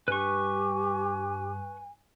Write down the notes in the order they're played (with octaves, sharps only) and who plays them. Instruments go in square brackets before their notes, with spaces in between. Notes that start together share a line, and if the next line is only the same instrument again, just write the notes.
[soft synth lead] G2 [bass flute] G4 [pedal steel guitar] B4 C#6 [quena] G#5